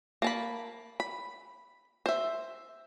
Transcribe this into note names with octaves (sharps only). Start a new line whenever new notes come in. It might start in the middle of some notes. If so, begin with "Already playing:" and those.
A#3 A5 B5
B5
C5 E5